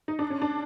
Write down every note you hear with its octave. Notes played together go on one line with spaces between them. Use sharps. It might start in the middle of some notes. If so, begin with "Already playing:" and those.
D#4
D4
C#4
D4